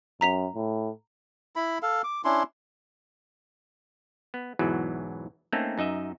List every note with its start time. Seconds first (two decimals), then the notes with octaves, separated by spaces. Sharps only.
0.21 F#2 A#5 B6 F7
0.55 A2
1.56 E4 B5
1.82 A4 F5
2.04 D6
2.25 C#4 D4 E4 C6
4.34 B3
4.59 E2 G#2 B2 E3 F#3
5.53 A3 A#3 C4 C#4 D#4 A4
5.78 F#2 D#4 D#5 E5